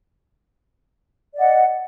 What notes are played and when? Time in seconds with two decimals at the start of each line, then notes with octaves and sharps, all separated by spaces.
1.33 D5
1.36 D#5
1.39 F#5